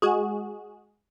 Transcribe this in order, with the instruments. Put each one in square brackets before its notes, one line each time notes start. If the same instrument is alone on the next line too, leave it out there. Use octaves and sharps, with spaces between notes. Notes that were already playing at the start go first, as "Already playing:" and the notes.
[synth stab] G#3 F#4 G#4